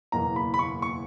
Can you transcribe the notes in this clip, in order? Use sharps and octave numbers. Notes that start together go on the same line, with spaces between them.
F#1 E2 B2 A#3 A#5
B5
B5
C#6
C#6